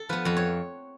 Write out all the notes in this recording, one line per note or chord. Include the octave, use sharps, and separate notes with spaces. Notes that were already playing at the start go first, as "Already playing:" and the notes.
Already playing: A4
F3 B3 B4
F2 B4
C#5